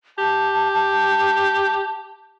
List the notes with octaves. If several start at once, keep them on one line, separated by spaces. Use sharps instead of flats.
G4 A5